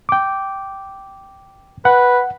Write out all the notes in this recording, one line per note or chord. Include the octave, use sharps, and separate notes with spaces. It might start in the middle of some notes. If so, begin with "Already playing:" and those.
G5 D6
B4 F#5